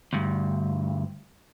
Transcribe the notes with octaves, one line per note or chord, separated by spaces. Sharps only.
D2 G2